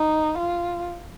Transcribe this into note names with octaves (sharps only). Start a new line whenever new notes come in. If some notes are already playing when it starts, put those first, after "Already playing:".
Already playing: D#4
F4